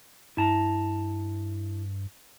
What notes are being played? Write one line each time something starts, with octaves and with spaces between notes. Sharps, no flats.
G2 E4 A5 A#5